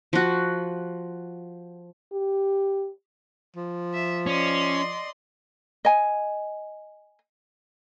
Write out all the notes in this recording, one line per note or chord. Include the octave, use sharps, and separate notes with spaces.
F3 F#4
G4
F3
E5
C#4 D5 D#5 C6
D#5 G#5